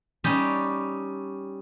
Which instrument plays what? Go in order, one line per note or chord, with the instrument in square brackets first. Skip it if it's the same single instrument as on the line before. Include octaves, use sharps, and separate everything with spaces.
[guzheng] G3 C#4 D#4 G4